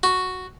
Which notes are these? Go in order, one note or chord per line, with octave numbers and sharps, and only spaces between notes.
F#4